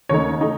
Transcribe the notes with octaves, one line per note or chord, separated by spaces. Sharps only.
D#2 C#3 A3 D#4 C#5
A3 D#4